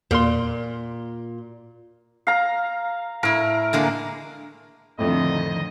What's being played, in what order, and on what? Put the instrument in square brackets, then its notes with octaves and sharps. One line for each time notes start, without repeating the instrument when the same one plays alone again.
[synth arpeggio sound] E2 A#4 C6 [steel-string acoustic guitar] A#2
[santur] F5 A#5
[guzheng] A2 E4 [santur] A#4
[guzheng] D3 G#3 A#3
[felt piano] F2 A2 [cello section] D3 D#3 F3 [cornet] D#5